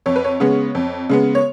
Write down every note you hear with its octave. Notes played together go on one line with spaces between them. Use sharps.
F2 C#5
B4
C#5
C#3 G#3 B3
F2
C#3 G#3 B3
C#5